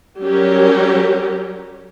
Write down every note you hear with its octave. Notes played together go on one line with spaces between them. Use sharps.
F#3 G3 C#4 G4 A#4